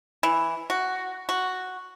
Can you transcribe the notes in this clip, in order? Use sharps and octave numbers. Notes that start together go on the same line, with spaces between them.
E3
F#4
F#4